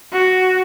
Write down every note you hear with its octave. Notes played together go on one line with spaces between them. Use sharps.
F#4